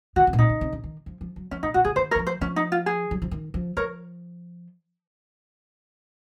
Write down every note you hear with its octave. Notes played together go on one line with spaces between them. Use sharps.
D#3 F#4
C#3
A#2
C3 D#4
C#3
C3
C#3
D#3
F3
F3
F#3
F3 C#4
C#3 D#4
C3 F#4
C#3 G#4
D#3 C5
A#4 C#5
F#3
F3
C5
F3 C#4
D#4
F4
G#4
F#3
F3
D#3
F3
F3 A#4 C#5